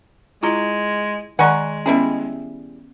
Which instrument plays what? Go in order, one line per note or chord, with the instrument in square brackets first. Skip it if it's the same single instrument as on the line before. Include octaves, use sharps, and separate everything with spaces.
[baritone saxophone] G#3 [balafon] E4 F4 A#5
[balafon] D#3 D5 A#5 [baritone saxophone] G#3 [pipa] F#5 G#5 C#6
[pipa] G3 E4 G#4 [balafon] B3 C#4